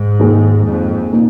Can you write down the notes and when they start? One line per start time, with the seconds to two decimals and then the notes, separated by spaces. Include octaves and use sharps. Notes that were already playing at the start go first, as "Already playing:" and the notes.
Already playing: G#2
0.19 D#2 D#3 G#3 D#4
0.66 F2
1.13 A#2 A#3 D#4